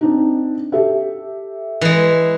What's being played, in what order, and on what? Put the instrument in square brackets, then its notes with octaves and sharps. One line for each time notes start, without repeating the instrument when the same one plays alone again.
[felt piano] C4 D4 D#4
G4 A4 E5
[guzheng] E3 G#3